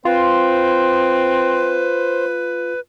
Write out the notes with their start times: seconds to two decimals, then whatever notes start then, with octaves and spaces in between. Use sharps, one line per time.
0.05 C4 F4 B4 C5